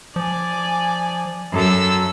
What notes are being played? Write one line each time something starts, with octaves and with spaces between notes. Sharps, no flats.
F3 D5 G#5
F#2 F#3 A4 E6